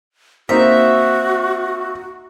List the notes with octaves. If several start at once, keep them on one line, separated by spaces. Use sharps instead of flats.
A#3 C4 D#4 F#4 E5